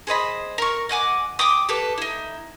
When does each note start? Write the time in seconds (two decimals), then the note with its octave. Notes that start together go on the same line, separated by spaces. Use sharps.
0.07 G#4 C5 D#5 B5
0.58 A#4 C#6
0.89 D#5 F#5 G#5 D6
1.39 G5 D6 D#6
1.69 G4 A4 B4
1.98 D#4 E4